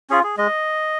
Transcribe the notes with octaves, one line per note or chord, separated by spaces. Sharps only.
C#4 F4 G#4
G#4
G#3 D#5